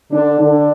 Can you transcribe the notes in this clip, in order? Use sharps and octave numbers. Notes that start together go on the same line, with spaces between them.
D3 D4
D3 D4